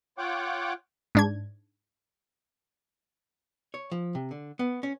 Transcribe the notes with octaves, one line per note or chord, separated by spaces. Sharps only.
F4 C#5 F#5 G5 D6
G#2 D4 G#6
C#5
F3
C3
D3
B3
C#4